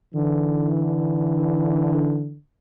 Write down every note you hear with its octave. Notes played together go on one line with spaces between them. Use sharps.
D3 E3